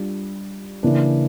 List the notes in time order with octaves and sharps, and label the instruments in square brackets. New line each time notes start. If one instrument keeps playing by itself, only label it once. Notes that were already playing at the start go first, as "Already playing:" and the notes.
Already playing: [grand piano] G3 D4 F4
C#3 E3 A#3 D4